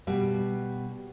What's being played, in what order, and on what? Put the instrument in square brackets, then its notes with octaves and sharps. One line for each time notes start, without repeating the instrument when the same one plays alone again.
[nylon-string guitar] B2 G3